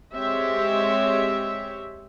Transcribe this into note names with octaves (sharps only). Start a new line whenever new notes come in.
G#3 C4 G4 C#5 E5